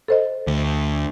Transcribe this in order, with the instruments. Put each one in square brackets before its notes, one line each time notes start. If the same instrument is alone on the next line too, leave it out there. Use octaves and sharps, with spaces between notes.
[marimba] A4 C5 D#5
[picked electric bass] D2